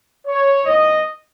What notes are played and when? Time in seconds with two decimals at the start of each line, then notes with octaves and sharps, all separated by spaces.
0.26 C#5
0.65 A2 E3 B3 D#4 D#5